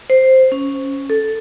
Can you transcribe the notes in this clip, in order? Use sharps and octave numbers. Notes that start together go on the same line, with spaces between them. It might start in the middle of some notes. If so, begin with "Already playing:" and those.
C5
C#4
A4